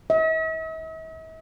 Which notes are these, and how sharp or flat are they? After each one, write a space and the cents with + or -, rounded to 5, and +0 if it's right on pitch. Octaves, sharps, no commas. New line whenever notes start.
E5 -45